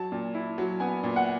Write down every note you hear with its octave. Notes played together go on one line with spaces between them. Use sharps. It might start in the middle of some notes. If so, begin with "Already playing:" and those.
Already playing: F#3 A5
A#2
E4
F#3
B3 G#5
A#2
F#5